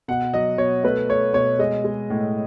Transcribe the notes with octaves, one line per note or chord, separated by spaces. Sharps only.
B2 F#5
F#3 D#5
B2 C#5
A3 B4
A3 C#5
B2 C#5
G#3 D#5
G#3
A2